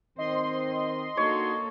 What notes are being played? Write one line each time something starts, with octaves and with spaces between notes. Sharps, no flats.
D#3 C4 C5 D#5 C6
A#3 D4 D#4 F#4 A4 C#5